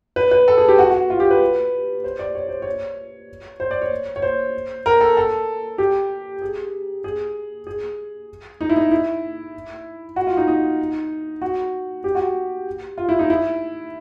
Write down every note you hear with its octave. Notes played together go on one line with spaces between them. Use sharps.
B4
B4
A4
G#4
G4
F#4
F#4
F4
G4
B4
C5
D5
C#5
C5
C#5
C5
D5
C#5
C#5
C5
A#4
A4
A4
G4
G#4
G#4
G#4
D#4
E4
D#4
E4
F#4
F4
D#4
D#4
F#4
G4
F#4
F4
E4
D#4
E4